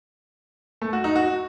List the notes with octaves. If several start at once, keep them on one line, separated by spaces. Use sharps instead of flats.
A3
F#4
D#4
F#4